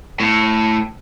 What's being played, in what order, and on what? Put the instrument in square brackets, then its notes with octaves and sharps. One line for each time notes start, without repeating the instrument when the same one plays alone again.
[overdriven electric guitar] A2